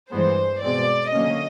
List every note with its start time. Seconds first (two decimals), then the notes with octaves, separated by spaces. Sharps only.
0.12 G2 E3 G#3 B3 C5
0.61 B2 G#3 C4 D5
1.12 D3 F#3 A#3 C#4 D#5